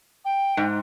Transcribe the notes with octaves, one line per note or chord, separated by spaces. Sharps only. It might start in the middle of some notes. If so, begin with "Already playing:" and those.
G5
G#2